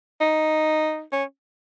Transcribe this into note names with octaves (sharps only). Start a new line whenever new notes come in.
D#4
C#4